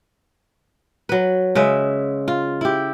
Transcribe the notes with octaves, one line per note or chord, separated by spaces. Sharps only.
F#3 B4
C#3 G#3 B4 E5
F4
E4 G4